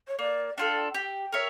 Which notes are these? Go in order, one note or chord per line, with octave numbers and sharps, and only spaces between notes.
C#5
A#3 D5
D4 F4 A4 G5
G4 G5
A#4 C#5 E5